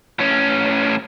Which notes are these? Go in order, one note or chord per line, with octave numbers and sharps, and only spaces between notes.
A2 C#4